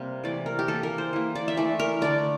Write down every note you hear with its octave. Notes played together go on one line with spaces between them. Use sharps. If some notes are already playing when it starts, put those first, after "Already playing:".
Already playing: C3 G3 A#3
E3 A3 D5
A#4
G4
E3 A#3 A4
A#4
C5
E3 A#3
D5
E5
E3 A3 D5
A#4
D3 A3 D5